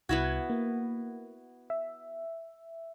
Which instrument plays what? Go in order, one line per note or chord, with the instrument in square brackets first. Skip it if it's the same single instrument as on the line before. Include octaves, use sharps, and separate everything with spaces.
[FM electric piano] C2 G#6 [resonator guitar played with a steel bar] B3 E4 F#4
[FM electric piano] A#3
E5